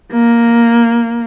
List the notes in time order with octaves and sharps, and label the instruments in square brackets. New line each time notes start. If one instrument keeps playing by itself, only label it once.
[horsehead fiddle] A#3